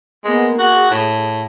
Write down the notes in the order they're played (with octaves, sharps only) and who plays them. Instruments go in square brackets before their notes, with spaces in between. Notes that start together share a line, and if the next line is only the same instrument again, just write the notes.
[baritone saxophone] G#3 [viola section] A#3 B3
[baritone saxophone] F#4 [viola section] G#4
[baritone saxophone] A2